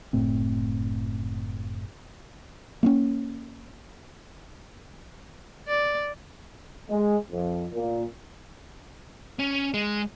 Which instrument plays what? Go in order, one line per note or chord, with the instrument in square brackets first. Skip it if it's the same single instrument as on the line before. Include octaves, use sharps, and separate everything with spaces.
[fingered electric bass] F#1 A2 A3 C4
[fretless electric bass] A#3 B3 C#4
[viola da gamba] D5
[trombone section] G#3
F2
A#2
[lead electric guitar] C#4
G#3